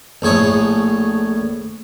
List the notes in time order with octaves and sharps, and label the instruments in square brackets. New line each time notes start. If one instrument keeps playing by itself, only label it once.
[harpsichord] A#1 A2 G#4 C#5 D#6